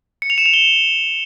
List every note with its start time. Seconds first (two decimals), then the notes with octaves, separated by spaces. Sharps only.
0.22 C#7
0.30 F7
0.38 E7
0.46 F7
0.53 G7